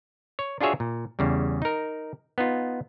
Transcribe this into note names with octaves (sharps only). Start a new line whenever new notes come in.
C#5
D4 F4 F#4 G#4 C#5 E5
A#2
E2 C#3 G3
D#4 A#4
B3 D#4 F4